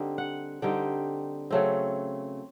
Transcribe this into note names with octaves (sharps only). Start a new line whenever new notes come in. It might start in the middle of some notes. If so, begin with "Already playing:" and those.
Already playing: D3 G3 C4 D#4
F#5
D3 G3 C4 D#4 G5
C#3 F#3 A3 C4